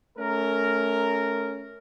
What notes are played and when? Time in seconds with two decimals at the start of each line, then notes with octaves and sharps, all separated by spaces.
0.18 A3 C#4 A#4